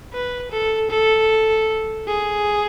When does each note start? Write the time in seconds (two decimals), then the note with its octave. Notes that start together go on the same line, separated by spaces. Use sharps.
0.13 B4
0.52 A4
0.90 A4
2.08 G#4